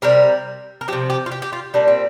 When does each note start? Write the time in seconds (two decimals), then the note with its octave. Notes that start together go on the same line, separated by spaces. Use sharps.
0.02 C3 G3 A#4
0.81 A#4
0.88 F3 G4
0.93 C3
1.10 G4
1.26 F4
1.31 G4
1.42 G4
1.53 F4
1.74 A#2 G3 D4
1.88 C4